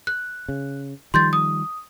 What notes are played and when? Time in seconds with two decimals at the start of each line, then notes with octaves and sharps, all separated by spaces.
0.07 F#6
0.49 C#3
1.14 D#3 F3 G3 C6 G6 A6
1.33 D#6